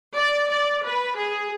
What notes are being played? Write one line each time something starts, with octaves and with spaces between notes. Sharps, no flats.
D5
D5
B4
G#4